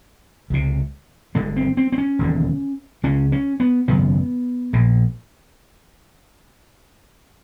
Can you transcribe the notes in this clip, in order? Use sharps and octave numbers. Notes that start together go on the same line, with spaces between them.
C#2 C3
G1 G2 D3 G#3
C4
C4
C4
C#4
E1 D#2 D3
C#2 C#3 C#4
C#4
B3
G#1 F#2 C#3 B3
A#1 A#2